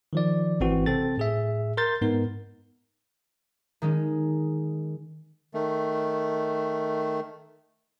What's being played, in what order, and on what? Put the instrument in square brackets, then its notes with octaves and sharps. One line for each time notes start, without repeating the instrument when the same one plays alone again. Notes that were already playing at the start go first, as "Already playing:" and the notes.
[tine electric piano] D#3 F3 D5
G#1 E3 C4 F#4
C3 C4 A4 A6
A2 G#4 E5
A#4 C6 G6 A6
G#2 B3 D#4 A#4
[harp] D#3 G#3 C#4
[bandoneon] D#3 A3